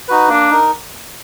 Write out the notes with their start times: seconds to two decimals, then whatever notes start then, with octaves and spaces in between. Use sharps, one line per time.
0.08 D#4 F#4 B4
0.29 A#3 D4
0.50 D#4 A#4